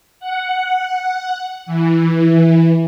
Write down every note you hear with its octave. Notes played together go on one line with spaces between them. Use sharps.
F#5
E3